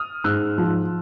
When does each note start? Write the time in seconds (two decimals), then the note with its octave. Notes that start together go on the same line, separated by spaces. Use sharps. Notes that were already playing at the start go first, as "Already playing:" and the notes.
Already playing: D#6 F6
0.24 G#2 E6 F#6
0.58 F3